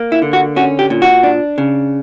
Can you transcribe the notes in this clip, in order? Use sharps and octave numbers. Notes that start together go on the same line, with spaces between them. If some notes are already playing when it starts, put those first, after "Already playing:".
Already playing: A#3
E4
D3
F#4
C#4 F#4
G4
A#2
F#4
D4
C#3